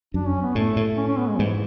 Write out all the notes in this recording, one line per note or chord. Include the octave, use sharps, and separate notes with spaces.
F#2 D4
C#4
B3
A2 A3
A2
C#4
C#4
B3
G#3
G#2 E3